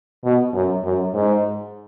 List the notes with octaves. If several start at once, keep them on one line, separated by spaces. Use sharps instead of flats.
B2
F#2
F#2
G#2